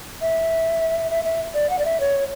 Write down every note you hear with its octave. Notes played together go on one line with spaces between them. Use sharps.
E5
E5
E5
D5
F#5
D5
E5
C#5